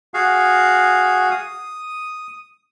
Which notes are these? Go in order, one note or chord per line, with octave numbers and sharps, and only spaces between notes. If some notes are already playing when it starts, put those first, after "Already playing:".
F#4 G#4 F5
D#6